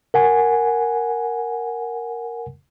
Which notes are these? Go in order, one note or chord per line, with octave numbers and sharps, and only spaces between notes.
A#4 F#5 G#5